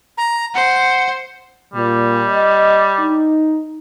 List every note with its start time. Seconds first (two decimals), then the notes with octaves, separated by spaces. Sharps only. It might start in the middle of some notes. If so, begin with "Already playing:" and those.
0.18 A#5
0.55 C5 F#5
1.74 A#2 G3
2.28 D#5
3.00 D#4